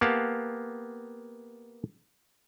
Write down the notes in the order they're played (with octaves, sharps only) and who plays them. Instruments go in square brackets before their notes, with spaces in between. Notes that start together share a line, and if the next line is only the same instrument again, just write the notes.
[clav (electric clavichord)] A#3 B3 G4 F5 F#5 A5